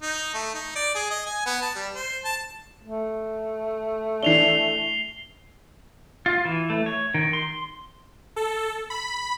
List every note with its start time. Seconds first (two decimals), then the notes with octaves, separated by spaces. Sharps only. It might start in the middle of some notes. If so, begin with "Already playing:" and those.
0.02 D#4
0.34 A3
0.54 D#4
0.75 D5
0.95 G#4
1.10 D#5
1.26 G#5
1.46 B3
1.62 A5
1.75 G3
1.95 C5
2.24 A5
2.82 A3
4.23 E3 D4 C7 F7 G7
6.26 F4
6.45 E3
6.70 A3
6.86 C#5
7.14 D#3
7.33 C6
8.36 A4
8.90 B5